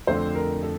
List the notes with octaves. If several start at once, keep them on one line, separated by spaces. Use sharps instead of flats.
F2 D3 A3 C5
A#4
A4